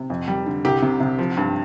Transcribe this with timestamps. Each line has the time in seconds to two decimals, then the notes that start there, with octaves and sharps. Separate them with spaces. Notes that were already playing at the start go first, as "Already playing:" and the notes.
Already playing: C3
0.10 F2
0.28 G3
0.46 D3
0.65 C2 G4
0.82 C3
1.00 C3
1.19 F3
1.37 G2